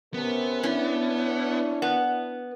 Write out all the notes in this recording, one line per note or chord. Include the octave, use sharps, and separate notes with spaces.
C3 B3 C#4 A#4
C#4 D4 E4
B3